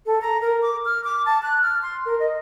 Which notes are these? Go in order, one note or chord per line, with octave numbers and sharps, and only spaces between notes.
A4
A#5
A#4
D6
F6
D6
A5
F#6
F6
C6
A#4
D#5